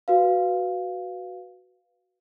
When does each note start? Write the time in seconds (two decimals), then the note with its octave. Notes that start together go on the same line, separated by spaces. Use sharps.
0.08 F#4 B4 F5